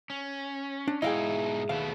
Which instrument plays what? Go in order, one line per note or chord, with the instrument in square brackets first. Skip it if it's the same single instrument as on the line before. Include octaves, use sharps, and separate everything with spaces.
[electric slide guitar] C#4
[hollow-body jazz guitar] D4
[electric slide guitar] G#2 B2 D#4 [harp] E4 G#4 [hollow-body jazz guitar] D#5 F5 G5
[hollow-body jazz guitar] D#2 F5 [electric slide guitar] B2 A3 B3